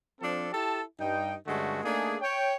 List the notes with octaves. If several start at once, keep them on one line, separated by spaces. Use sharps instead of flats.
F3 C4 D4 A4
E4 G4 A4 A5
G2 D#4 G5
G2 D3 G#3 A3 C#4 F#4
A3 A#3 D4 D#4 G#4
C#5 G5